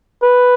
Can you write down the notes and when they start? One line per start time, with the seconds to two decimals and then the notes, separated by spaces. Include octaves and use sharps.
0.23 B4